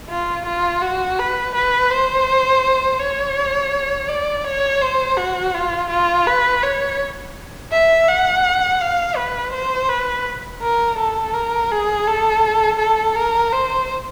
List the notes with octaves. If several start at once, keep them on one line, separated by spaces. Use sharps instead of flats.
F4
F4
F#4
B4
B4
C5
C#5
D5
C#5
C5
F#4
F4
F4
B4
C#5
E5
F#5
F5
B4
C5
B4
A#4
A4
A#4
G#4
A4
A4
A#4
C5